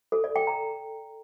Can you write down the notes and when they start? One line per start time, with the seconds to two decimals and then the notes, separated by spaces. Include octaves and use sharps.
0.12 A4
0.24 D5
0.36 G5
0.47 A#5